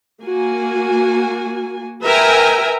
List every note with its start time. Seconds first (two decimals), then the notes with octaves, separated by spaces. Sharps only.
0.22 A#3 F#4 G#5
2.04 A#4 B4 E5 G5 G#5 A#5